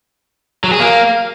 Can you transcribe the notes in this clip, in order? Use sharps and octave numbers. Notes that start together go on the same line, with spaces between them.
F#3
G#4
A#3